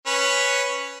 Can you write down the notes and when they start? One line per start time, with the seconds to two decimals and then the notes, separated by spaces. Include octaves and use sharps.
0.07 C#4 B4